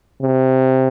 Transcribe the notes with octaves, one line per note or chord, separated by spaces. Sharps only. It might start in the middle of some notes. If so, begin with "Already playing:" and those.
C3